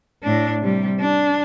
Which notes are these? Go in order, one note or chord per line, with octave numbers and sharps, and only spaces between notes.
A2 D4
C3 G3
D4